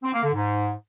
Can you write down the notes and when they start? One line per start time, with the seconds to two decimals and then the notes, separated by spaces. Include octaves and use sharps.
0.03 C4
0.13 A#3
0.23 D3
0.33 G#2